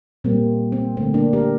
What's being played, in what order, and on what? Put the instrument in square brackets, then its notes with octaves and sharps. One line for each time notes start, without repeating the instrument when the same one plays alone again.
[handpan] A#2 G3 A#3 C4
C4
A3 C4
D3
A#3 D4
G4 A#4